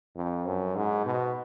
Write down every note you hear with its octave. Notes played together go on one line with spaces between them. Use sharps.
F2
F#2
G#2
B2